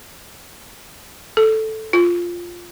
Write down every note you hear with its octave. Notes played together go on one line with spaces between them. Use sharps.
A4
F4